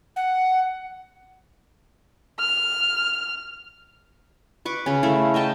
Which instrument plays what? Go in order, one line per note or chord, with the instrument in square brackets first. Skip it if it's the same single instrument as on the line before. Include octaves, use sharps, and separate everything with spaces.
[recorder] F#5
[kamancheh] F6
[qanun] B4 C#6 D6
C#3 C#4
A3 E4 F5
D#5 E5 G5 A5